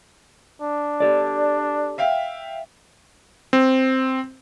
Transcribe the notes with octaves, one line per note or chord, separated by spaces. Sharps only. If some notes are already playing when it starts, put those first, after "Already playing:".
D4
G4 A4 D5
E5 F5 G5
C4